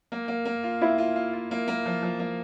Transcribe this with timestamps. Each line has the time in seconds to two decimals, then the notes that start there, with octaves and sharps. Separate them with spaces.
0.12 A#3
0.28 A#3
0.45 A#3
0.63 F4
0.81 E4 F4
0.98 F4
1.16 F4
1.33 F4
1.51 A#3
1.68 A#3
1.86 F3
2.03 F3
2.20 A#3